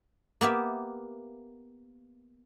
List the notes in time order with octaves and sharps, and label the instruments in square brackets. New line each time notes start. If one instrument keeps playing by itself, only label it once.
[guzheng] A#3 B3 G4 E5